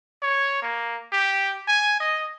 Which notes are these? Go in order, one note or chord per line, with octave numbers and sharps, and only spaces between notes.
C#5
A#3
G4
G#5
D#5